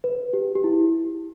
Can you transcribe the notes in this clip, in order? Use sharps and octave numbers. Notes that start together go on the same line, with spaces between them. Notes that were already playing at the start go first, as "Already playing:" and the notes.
B4
G4
G4
E4